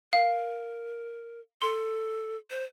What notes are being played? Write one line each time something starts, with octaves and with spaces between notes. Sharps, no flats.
A#4 F5
A4 C6
C5